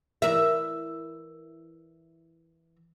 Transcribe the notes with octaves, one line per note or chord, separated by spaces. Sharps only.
E3 A#4 E5